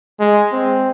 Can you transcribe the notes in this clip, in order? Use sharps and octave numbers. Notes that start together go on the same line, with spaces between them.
G#3
C4